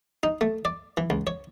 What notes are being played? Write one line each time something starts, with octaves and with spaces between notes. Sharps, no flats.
D#4
A3
D5
E3
C#2
C#5